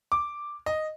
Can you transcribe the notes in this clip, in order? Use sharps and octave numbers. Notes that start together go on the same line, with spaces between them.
D6
D#5